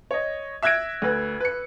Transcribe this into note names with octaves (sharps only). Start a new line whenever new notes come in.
C#5 D#5
E5 E6 F#6 G#6 A#6 D7
D2 B4
B4 C#7